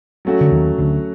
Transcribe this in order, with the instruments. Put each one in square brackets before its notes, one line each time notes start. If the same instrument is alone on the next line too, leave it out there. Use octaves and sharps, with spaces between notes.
[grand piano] F#3 A3 C#4 F#4
[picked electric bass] D3
D#2 D#3
D2 D3